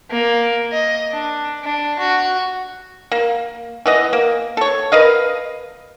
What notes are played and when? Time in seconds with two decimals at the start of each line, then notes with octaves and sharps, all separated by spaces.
0.10 A#3
0.72 D#5
1.11 D4
1.63 D4
1.99 F#4
3.12 A#3
3.86 E3 B3 D#5
4.13 A#3
4.57 A4 C#5
4.92 A#4 B4 D#5 F5